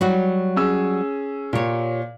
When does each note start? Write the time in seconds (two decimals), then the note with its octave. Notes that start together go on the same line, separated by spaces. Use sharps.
0.01 F#3 G3 F#4
0.56 C#4 G#4 E6
1.53 A#2 G4 C#5